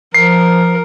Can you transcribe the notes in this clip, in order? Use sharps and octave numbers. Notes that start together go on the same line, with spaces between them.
F3 A#4 C7